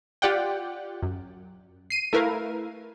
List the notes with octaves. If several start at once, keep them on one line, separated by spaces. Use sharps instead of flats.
F4 G4 D5 F#5 G5
F#2
C7 D#7
A3 E4 A#4 B4 F5